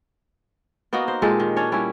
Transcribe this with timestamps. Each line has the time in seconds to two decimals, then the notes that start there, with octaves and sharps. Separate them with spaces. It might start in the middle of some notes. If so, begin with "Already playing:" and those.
0.93 A#3 B3 D#4 F#4
1.08 C5
1.22 A#2 G#3 G4 A4
1.40 D#3
1.56 C#4 D4 C#5
1.72 G3 C#4 E4